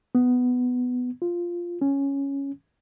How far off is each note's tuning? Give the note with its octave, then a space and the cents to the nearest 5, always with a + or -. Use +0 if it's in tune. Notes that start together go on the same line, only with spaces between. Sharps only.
B3 +10
F4 -5
C#4 +0